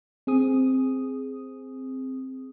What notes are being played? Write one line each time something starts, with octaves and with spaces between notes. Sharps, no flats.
C4 G#4 D#6